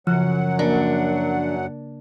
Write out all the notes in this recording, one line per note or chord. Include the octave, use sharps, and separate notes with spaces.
F#2 C#3 F3 F#3 F#5 F#6
A#3 D4 A#4